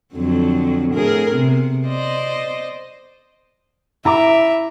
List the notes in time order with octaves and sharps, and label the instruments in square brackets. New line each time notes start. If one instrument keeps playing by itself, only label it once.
[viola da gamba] F2 D3 F#3
A2 G#4 A#4
C3 B3
C5 D5 D#5
[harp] E4 A#5 D6 [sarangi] E5